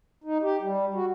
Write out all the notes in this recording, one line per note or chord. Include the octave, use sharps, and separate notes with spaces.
D#4
G4
G3
F#4